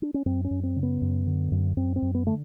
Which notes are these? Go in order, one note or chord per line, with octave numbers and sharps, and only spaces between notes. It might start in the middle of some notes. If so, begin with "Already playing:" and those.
D4
C#4
F#2 C4
C#4
F#2
C4
C#3
B3
F#2
D3
F#2
F#2 C4
C4
F#2
B3
D3 A3